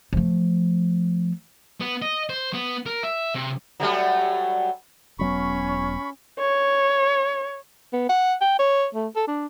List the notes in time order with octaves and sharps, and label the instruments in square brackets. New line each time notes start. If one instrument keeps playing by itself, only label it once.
[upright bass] F3 A3
[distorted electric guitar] B3
D#5
C5
B3
A#4
E5
C3
[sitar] F#3 G3 A3
[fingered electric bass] E1 F#3 B3 [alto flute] C#4 [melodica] B5 C#6
[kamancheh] C#5
[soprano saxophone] B3
F#5
G5
C#5
A3
A4
D4